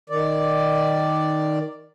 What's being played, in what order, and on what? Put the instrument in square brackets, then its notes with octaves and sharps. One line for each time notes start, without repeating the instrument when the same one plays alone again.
[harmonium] D#3 D5